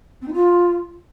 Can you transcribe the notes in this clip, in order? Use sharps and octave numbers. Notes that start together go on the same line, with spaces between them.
C4
D#4
F4